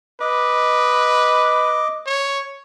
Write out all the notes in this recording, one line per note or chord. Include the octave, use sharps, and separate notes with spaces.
B4 D#5 D6
C#5